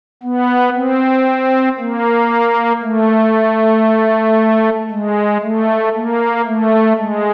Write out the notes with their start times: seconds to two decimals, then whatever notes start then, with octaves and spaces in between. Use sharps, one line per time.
0.23 B3
0.75 C4
1.79 A#3
2.83 A3
4.91 G#3
5.42 A3
5.95 A#3
6.46 A3
6.98 G#3